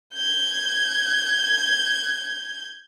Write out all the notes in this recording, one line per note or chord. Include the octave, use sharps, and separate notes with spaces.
G6 G#6